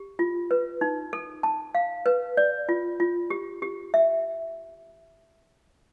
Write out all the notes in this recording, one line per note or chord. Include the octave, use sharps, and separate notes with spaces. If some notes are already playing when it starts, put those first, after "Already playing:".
Already playing: G4
F4
B4
D#4
A4
A5
F5
B4
D5
F4
F4
G4
G4
E5